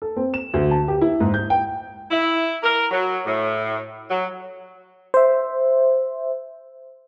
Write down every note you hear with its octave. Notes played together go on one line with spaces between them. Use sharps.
A4
C4
E7
D2
A5
G4
E4
G#2
G6
G5
E4
A#4
F#3
A2
F#3
C5 E5